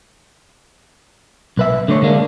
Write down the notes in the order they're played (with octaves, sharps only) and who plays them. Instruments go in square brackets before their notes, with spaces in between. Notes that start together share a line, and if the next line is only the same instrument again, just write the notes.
[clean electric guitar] B1 B4 E5
D3 A3 C#5
D3 G#3 A#3 D4